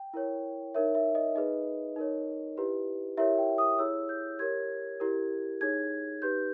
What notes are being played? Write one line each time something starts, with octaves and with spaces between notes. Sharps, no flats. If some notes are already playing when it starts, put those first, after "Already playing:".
Already playing: G5
E4 A#4 C#5
D#4 A#4 C#5 E5
E5
D#5
D#4 G#4 B4 D#5
D#4 A#4 C#5
E4 G4 B4
E4 G4 A#4 C#5 E5
G5
D#6
E4 G#4 C#5 E6
G6
G4 A#4 C#5 G#6
E4 G4 A#4
D#4 G#4 C#5 G#6
D#4 G4 B4 G6